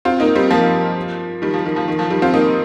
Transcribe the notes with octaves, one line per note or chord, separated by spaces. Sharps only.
C4 F4
A#3 D#4
G3 C4
F3 A#3
D#3 G3
F3
D#3
F3
D#3
F3
D#3 G3
C4 F4
A#3 D#4